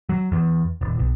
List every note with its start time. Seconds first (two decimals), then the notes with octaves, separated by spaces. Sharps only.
0.09 F#3
0.32 E2
0.81 D#1
0.99 B1